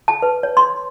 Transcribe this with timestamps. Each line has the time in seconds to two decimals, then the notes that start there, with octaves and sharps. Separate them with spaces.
0.08 A5
0.22 B4
0.43 C#5
0.57 C6